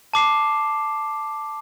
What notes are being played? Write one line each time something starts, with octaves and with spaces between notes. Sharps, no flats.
A5 D6 C7 E7